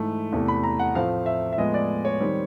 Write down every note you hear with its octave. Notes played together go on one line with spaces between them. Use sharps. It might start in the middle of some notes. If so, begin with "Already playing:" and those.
Already playing: G#2 E3 A3
E2 C3 E3 A3
B5
A#5
F#5
A2 F3 A3 C4 F5
E5
E5
A2 F3 G#3 B3 D#5
D5
C#5
D#3 G3 C4